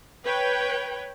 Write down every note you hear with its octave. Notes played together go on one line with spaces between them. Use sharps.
B4 C#5 G5